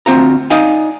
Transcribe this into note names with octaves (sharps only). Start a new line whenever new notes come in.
D2 C4 F4 A#5
D#4 D5 D#5 F5 G#5